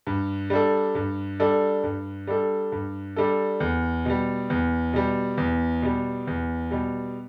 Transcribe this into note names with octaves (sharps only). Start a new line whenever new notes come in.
G2
G3 D4 A4
G2
G3 D4 A4
G2
G3 D4 A4
G2
G3 D4 A4
E2
B2 G3
E2
B2 G3
E2
B2 G3
E2
B2 G3